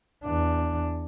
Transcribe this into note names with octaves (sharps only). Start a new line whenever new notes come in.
E2 D4